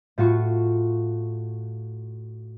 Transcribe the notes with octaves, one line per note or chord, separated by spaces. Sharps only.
A2 F4 F#4 C#6